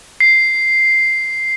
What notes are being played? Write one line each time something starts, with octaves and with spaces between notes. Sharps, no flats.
C7